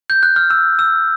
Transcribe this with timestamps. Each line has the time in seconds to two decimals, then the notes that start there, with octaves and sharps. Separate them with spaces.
0.10 G6
0.23 F#6
0.36 F6
0.50 E6
0.79 E6